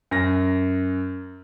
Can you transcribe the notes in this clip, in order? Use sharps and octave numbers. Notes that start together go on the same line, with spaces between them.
F#2 A#6